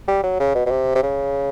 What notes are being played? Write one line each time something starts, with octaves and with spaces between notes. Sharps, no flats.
G3
F#3
C#3
B2
B2
C3
C3
C#3